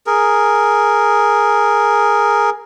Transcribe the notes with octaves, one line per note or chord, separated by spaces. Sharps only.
G#4 A#4